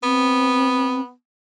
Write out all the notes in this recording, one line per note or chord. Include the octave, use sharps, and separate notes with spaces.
B3 C4